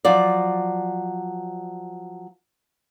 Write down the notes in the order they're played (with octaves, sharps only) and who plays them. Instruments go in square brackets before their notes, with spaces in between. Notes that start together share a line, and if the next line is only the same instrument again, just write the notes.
[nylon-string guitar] F3 F#3 D5